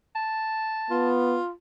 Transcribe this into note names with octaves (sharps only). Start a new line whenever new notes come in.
A5
B3 F4